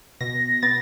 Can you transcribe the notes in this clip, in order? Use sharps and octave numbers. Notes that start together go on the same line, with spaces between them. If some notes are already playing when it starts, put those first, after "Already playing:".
B2 A#6
B3 A6